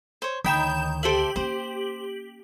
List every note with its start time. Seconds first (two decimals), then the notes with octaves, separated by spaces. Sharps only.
0.22 C5 C#5
0.44 D2 D#3 C#5 G5 B5 G6 E7
1.03 G4 A4 C5 E5 F#7
1.36 A#3 C#4 C5